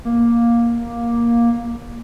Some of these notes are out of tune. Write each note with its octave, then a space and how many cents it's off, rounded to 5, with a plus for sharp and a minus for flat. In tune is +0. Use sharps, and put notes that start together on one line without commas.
A#3 +10